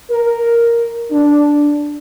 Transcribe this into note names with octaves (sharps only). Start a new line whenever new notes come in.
A#4
D4